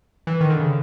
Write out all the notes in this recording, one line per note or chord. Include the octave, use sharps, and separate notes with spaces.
E3
D#3
D3
C#3